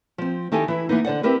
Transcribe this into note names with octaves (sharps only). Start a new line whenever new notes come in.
F3 C4
D#3 D#4 E4 G4 A4 G#5
E3 E4
E3 A#3 B3 D#4
D3 C5 D5 F#5
C4 E4 G4 A#4 B4